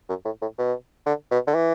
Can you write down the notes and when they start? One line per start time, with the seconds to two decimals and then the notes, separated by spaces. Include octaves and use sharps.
0.09 F#2
0.25 A2
0.42 A2
0.58 B2
1.06 D3
1.31 B2
1.47 D3
1.55 E3